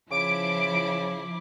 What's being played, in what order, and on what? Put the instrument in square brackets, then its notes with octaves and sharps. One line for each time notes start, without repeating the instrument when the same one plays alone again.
[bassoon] C#3 [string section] F3 E4 [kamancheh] D6 [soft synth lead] D7